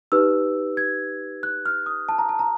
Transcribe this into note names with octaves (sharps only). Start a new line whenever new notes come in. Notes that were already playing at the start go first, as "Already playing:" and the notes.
D#4 G4 B4 E6
G#6
F#6
F6
D#6
A5
A#5
A5
A#5